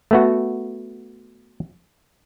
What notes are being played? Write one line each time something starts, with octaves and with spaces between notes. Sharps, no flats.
A3 B3 F#4